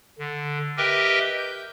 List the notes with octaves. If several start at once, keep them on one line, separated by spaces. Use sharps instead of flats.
D3
G4 A#4 B4 D#5 E5 G5
G6